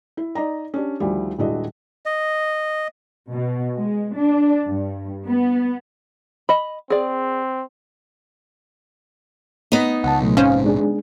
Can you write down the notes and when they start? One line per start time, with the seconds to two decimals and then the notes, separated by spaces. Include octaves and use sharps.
0.17 E4
0.35 D#4 D5 D#5 A#5
0.74 C#4 D4 G4
1.00 D2 D#3 F3 G3
1.39 D#1 G#3 D4 E4 F#4 D#5
2.06 D#5
3.32 B2
3.77 G#3
4.18 D4
4.67 G2
5.27 B3
6.49 D#5 B5
6.90 C4 G#4 D5
9.72 B3 D#4
10.04 C#2 F#5 A5
10.21 B2 F#3 A3
10.37 A#1 G#2 C3 C#4 C5 F5
10.64 G#3 D4 G#4